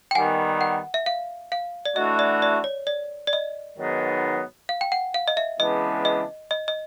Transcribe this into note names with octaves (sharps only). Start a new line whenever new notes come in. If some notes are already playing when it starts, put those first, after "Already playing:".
G5
D#3 G3 B3 F#5 G#5
F#5
E5
F5
F5
D5
E3 A3 D4 F#4 D#5
D5
D5
C#5
D5
D5
D#5
G#2 D#3 F#3 B3
F5
G5
F#5
F5
D#5
E5
C#3 E3 G#3 B3 D4 D#5
D#5
D#5
D#5